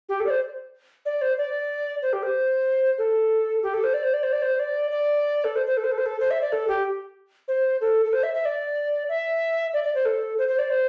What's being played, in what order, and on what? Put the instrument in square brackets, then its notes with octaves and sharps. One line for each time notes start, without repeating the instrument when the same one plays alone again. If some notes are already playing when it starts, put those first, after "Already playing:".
[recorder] G4
A4
D5
C5
D5
C5
D5
C5
G4
C5
A4
G4
A4
C5
D5
C5
D5
C5
D5
C5
D5
D5
A4
C5
C5
A4
C5
A4
C5
A4
C5
E5
D5
A4
G4
C5
A4
A4
C5
E5
E5
D5
E5
D5
D5
C5
A4
C5
C5
D5
C5